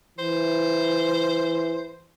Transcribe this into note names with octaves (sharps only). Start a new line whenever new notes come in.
E3 C5